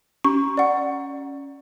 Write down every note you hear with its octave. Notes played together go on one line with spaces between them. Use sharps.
C#4 C#6
D5 F#5